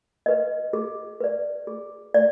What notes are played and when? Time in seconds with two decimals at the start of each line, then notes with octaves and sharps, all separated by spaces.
0.26 B4 D#5
0.73 G#4
1.21 B4 D5
1.67 G#4
2.14 D5